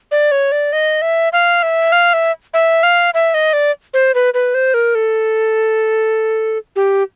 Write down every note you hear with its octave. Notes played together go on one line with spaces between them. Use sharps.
D5
C#5
D5
D#5
E5
F5
E5
F5
E5
E5
F5
E5
D#5
D5
C5
B4
B4
C5
A#4
A4
G4